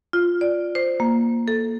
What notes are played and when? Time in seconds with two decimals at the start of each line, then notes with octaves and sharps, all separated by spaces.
0.13 F4
0.41 D5
0.75 C5
1.00 A#3
1.48 A4